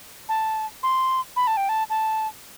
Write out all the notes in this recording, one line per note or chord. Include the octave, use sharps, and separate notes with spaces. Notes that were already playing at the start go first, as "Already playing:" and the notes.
A5
C6
B5
A5
G5
A5
A5